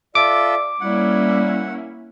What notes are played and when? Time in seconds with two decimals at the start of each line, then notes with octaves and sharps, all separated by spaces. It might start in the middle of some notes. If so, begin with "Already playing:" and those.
0.15 F4 A4 D5 E5 D6
0.81 G3 A#3 C#4 E4 F#5